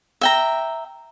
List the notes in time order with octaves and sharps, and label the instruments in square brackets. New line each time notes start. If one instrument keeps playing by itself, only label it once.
[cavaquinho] E5 G5 A#5